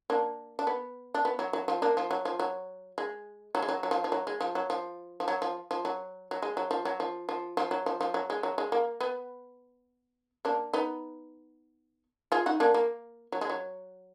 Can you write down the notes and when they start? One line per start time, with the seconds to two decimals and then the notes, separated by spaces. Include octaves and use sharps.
0.10 A#3 D4
0.59 D4
0.67 B3
1.14 D4
1.25 B3
1.39 F#3
1.53 F#3
1.68 F3
1.82 A#3 D4
1.97 F3
2.11 F#3
2.25 F3
2.40 F#3
2.98 G#3
3.55 F#3
3.62 G#3
3.69 F#3
3.83 F#3
3.91 F3
4.04 F3
4.12 F#3
4.27 G#3
4.41 F3
4.55 F#3
4.70 F3
5.20 F3
5.28 F#3
5.42 F3
5.71 F3
5.85 F#3
6.31 F#3
6.42 G#3
6.57 F#3
6.71 F3
6.85 F#3
7.00 F3
7.29 F3
7.57 F3
7.71 F#3
7.86 F3
8.01 F3
8.14 F#3
8.30 G#3
8.43 F#3
8.58 G#3
8.72 A#3
9.01 B3
10.45 A#3 D4
10.73 B3 D#4
12.32 F4 G#4
12.46 D#4 F#4
12.60 A#3 D4
12.74 A#3
13.32 F#3
13.41 G#3
13.50 F#3